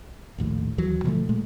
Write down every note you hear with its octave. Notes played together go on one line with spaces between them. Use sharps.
A#1 D#2 A2
D#2 E3 F#3
B2 D3 F3 A3
A#2 G#3 A3